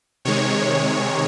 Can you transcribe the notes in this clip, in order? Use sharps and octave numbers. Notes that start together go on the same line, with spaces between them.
C3 D#3 G#3 C#5